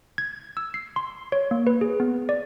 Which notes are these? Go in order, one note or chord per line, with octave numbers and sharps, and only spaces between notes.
G#6
E6
C7
C6
C#5
A#3
B4
G#4
B3
D5